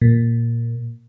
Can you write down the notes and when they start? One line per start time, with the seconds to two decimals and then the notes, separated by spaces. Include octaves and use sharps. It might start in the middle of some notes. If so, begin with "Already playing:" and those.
0.02 A#2